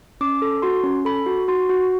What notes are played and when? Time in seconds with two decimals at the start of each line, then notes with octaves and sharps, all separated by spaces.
0.21 C#4 D6
0.42 A4
0.62 F#4 C6
0.84 C#4
1.05 A4 B5
1.26 F#4
1.48 F#4 C6
1.70 F#4